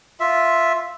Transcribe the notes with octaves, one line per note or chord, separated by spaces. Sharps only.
F4 E5